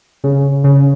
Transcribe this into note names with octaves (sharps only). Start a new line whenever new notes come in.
C#3
C#3